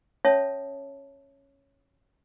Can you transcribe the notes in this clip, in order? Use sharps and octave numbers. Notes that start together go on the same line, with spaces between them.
C#4 C#5 E5 A5 D#6